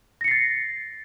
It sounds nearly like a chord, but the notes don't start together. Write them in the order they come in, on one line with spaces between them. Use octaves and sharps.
A#6 C#7 C7 A6